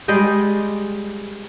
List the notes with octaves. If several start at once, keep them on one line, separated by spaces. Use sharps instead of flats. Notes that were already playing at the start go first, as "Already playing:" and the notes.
G3 G#3 D#5 G5